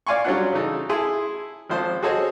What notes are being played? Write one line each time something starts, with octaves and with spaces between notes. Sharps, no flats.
D5 F5 G#5 C6 C#6
F#3 G3 C#4 D4 F4 F#5
C#3 E3 D#4 A4
E4 G#4 G#5 A5 C6
G#1 F3 C5 A5 D#6
F#4 G#4 A4 C5 C#5 D#5